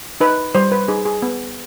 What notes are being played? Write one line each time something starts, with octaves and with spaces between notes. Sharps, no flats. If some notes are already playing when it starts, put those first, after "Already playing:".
D#4 B4
G3 C5
B4
D#4 G#4
G#4
B3